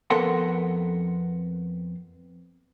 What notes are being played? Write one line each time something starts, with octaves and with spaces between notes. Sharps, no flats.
F2 B3 A4 A#4 F#5 C6